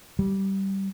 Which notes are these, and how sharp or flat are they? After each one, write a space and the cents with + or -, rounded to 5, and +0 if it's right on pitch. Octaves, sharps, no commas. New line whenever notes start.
G3 -15